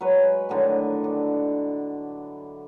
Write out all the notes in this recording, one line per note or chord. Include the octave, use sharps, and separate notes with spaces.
F#3 G#3 B4 C#5
A2 D3 D#3 F#3
D4